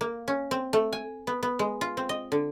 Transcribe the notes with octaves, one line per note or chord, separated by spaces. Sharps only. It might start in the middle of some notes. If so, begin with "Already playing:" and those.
A#3
C#4
C4
A3
G#5
B3
B3
G#3
F4
C4
D#5
D3